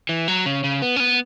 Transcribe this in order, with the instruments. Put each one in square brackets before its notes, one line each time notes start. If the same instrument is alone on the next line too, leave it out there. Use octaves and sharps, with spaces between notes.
[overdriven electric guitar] E3
F#3
C#3
C#3
B3
C#4
B3